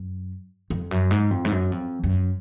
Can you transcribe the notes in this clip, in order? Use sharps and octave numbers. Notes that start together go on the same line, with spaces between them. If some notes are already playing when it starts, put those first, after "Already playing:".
Already playing: F#2
F2
F#2
G#2
F2
G#2
F#2
F2
F#2